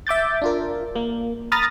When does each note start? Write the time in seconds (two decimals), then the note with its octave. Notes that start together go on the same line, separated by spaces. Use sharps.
0.07 E5 D6 G6 A6
0.42 D4 F4 A#4
0.96 A#3
1.52 A#5 B5 D#6 F6 A6 A#6